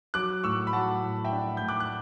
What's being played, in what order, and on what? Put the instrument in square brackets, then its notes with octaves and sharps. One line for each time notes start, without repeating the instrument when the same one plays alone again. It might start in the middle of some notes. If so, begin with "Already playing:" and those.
[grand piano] F#3 D6 F#6
A2 C#6 E6
B5
F#3 F#5 A5
A2
E5 G5
D4
A2 G6
D6 F#6
F#6